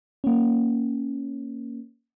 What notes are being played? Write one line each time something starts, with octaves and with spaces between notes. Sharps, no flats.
A#3 C#4